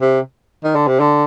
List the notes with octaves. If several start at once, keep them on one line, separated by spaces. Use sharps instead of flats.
C3
D#3
D3
C3
D3